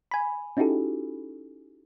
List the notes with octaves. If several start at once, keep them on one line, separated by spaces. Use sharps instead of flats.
G#5 B5
C#4 D#4 E4 F#4 G4 A4